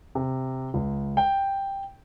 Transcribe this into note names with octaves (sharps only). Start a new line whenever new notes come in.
C3
C#2
G5